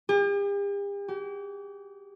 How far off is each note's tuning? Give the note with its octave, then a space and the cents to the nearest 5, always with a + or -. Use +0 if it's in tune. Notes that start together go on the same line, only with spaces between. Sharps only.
G4 +45
G4 -40